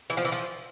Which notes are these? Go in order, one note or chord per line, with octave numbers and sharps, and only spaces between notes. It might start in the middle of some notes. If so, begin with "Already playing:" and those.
E3
F3
E3
F3